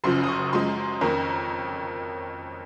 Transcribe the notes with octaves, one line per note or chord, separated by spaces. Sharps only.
F#1 F#2 C#3 F3 C6
D#6
C#6
F#2 F3 G#3 C6
F2 D#3 A#3 C#4 A#5